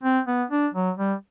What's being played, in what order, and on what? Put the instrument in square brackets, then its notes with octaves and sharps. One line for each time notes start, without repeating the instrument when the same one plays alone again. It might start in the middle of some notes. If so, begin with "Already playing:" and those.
[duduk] C4
B3
D4
F#3
G3